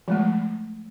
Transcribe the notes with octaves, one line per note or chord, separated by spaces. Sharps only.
F3 G#3 A3